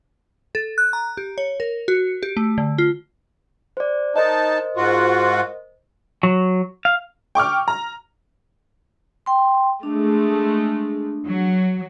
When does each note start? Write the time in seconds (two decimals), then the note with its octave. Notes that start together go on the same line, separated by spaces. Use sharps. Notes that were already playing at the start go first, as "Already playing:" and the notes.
0.55 A4
0.78 F#6
0.93 A#5
1.17 G4
1.38 C#5
1.60 A#4
1.88 F#4
2.23 G4
2.37 A3
2.58 D3
2.78 F4
3.77 C5 D5
4.16 D#4 A#4 C5 D#5 A5
4.77 G#2 F4 F#4
6.23 F#3
6.85 F5
7.35 G5 C#6 D6 F6
7.68 A#5
9.26 G5 C6
9.83 G#3 A3 D4
11.24 F#3